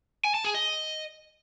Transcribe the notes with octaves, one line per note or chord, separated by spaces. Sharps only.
G#5
A5
G#4
D#5